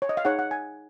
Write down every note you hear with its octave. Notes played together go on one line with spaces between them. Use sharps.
C#5
D#5
F5
D#4 G#4 C#5 F#5
F#5
G#5